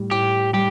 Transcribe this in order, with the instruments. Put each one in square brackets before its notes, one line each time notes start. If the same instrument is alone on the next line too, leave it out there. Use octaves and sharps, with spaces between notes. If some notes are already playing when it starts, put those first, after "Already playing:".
Already playing: [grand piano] A2 G3
[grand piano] A2 [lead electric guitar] G4
[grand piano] G3 [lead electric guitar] G4